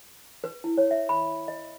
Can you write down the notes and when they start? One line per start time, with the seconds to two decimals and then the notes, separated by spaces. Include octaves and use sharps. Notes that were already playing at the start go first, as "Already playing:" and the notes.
0.44 B4
0.64 E4
0.78 C#5
0.91 E5
1.09 B5
1.48 D#5